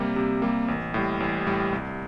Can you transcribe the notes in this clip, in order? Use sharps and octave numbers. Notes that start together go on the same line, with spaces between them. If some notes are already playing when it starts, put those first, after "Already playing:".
Already playing: C3 G3 A#3
C3
G3 A#3
A1
A2 G3
A1
A2 G3
C2